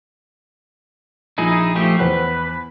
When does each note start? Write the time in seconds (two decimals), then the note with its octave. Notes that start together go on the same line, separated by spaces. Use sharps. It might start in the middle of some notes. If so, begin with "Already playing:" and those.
1.38 A#1 D#4 E4 G#4
1.75 F3 A3 G4
1.99 E2 B4 C5 F#5